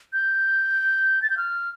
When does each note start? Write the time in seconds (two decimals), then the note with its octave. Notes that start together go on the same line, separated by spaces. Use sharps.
0.13 G6
1.22 A6
1.30 G6
1.37 F6